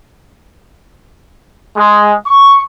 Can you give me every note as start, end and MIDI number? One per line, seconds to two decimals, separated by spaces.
1.77 2.15 56
2.27 2.64 85